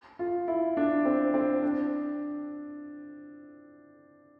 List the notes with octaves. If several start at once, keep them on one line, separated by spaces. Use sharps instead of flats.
F4
E4
D4
C4
C4
D4